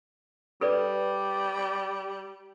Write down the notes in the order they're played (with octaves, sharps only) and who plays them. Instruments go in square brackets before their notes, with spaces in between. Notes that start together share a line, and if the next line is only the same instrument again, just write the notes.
[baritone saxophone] G3 [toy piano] A4 B4 D5